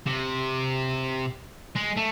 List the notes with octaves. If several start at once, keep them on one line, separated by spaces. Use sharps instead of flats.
C3
G#3
A3